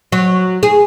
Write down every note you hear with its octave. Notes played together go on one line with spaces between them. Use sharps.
F#3
G#4